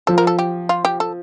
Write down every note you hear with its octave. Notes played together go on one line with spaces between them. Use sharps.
F3 A4
A#4
A4
G4
F4
G4
A4